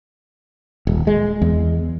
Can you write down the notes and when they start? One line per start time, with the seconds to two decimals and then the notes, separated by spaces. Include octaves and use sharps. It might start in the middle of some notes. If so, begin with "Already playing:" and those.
0.87 D#1
1.07 G#3
1.42 E2